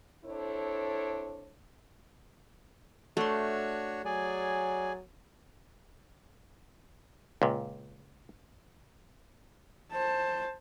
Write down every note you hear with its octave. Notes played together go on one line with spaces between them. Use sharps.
C4 D4 E4 A4 C#5
A3 D4 F#4 C#5 C6
F#3 G#4 D5 G#5
C#2 A#2
C5 A5